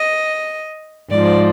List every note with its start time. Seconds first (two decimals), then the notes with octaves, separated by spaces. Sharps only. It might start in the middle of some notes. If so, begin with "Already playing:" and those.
Already playing: D#5
1.11 G#2 F3 D5